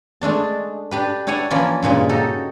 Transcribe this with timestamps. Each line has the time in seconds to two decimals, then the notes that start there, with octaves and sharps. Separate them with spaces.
0.21 G#3 A3 D4 A5
0.91 D4 G4 B4
1.27 D4 E4 C#5 F#5 G#5
1.50 E3 F3 A#3 C#4 D5
1.82 G2 A#2 C#3 G#3
2.09 D#4 F#4 G4 A4